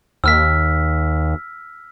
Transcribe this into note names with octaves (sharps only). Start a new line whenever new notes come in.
D#2 E6 F6 B6